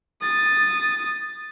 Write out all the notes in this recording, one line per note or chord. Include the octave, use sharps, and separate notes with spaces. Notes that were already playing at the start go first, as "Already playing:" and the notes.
D#6 A6